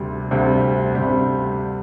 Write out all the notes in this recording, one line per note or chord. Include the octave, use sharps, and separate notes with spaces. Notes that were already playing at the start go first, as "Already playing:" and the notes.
Already playing: D2 C3 G3 C4
D2 C3 G3 C4
D2 C3 G3 C4